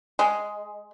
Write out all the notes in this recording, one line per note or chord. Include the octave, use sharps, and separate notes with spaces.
G#3